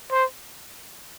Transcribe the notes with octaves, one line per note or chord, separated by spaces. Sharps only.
C5